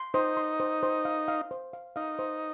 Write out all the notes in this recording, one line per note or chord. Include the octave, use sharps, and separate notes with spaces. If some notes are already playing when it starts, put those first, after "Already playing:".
Already playing: C6
D#4 C5
C6
C5
C5
F5
F5
C5
F5
D#4 F5
C5